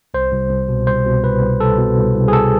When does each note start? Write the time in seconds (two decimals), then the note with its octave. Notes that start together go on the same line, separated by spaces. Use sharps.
0.14 C2 C5
0.33 C2
0.50 C2
0.69 B2
0.87 C2 C5
1.06 B2
1.24 C2 B4
1.42 C2
1.60 C2 A4
1.78 B2
1.97 C2
2.15 C2
2.28 G#4
2.33 C2 A4